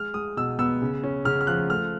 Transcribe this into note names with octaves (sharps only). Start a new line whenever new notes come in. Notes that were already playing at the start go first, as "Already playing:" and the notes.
Already playing: G#3 F6
G#3 D#6
B2 E6
B3 E6
C#3
C#4
C#3 F6
F6
F3 F#6
A3 F6